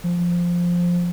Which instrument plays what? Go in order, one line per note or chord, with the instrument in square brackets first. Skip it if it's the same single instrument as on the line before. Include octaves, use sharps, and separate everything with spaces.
[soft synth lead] F3